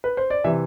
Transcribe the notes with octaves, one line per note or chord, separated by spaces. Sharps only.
B4
C5
D5
C3 E3 E5